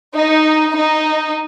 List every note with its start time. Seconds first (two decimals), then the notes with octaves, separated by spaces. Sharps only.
0.16 D#4
0.77 D#4